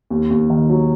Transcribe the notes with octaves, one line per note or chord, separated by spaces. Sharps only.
D#2
D#2
D#3
F#3